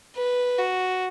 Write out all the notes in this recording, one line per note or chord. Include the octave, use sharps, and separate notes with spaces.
B4
F#4